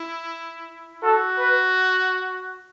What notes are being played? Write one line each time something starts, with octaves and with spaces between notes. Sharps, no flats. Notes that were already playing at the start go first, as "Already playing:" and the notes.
Already playing: E4
F#4 A4
B4